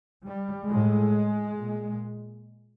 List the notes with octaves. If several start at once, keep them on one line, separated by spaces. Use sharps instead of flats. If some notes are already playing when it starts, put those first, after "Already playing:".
G3
A2 G#3
A#2